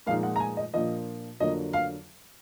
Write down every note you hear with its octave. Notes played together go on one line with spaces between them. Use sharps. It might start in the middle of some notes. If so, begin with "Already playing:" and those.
A#2 F3 G#3 D#4 F5
F#5
A#5
G#5
D#5
A#2 F3 A#3 D4 D#5
F2 D3 F#3 A#3 D#5
F5